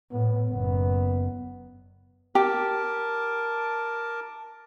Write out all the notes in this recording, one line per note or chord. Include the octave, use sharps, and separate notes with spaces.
A2 B3
F#1 B3
G4 A#4 A5 D6